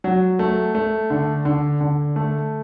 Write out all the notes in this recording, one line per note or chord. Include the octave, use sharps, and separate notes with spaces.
F#3
A3
A3
D3
D3
D3
A3